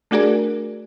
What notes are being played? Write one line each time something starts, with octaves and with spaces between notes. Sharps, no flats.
A3 D4 F#4 G#4 A#4 D5